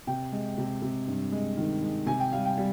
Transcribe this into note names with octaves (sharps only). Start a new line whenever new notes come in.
C3 G5
G#3
C3
C3
G2
G#3
D#3
G#3
C3 G#5
G5
G3 F5
G5
G3